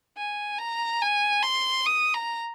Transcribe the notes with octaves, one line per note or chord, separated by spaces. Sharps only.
G#5
A#5
G#5
C6
D#6
A#5